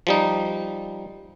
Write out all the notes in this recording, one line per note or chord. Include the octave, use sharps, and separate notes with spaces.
F3 G3 D#4